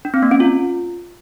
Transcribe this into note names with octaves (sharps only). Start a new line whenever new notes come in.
D4
C4
A#3
C#4
F4